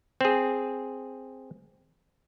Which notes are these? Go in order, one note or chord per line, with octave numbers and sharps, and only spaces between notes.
C4 G#4